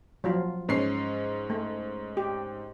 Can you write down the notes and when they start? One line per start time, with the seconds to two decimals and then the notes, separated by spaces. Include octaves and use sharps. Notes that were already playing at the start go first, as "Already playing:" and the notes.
0.24 F3 F#3 F4
0.69 G#2 C#4 C7
1.50 A3
2.17 G4